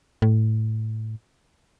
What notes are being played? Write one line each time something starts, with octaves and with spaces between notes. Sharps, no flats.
A2